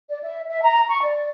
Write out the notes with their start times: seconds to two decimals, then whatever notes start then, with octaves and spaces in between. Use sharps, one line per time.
0.10 D5
0.23 E5
0.49 E5
0.63 A#5
0.89 C#6
1.02 D5